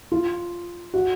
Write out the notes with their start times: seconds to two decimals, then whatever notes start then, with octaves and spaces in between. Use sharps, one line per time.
0.12 F4
0.94 F#4